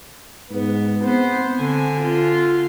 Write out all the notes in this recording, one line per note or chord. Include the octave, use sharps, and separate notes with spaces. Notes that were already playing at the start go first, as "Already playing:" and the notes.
G#2 B3
B3 C4 C5
D3 G#5
F4